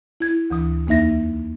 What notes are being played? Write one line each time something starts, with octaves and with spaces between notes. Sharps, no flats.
E4 G#6
D2 E3 D#6
E2 A#3 D#4 E5 A#6